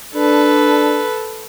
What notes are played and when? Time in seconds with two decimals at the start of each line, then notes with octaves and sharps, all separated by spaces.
0.15 D4 A4 B4